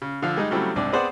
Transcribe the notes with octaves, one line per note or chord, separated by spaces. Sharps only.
C#3
D3 F3 F5 E6
G3 G#3 D#4
C#3 F#3 G3 A3 C4 E4
C2 G#2 C4 D4 D5
B3 C4 G#4 C5 D5 F#5